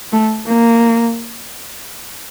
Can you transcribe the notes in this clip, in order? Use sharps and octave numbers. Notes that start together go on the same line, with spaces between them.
A3
A#3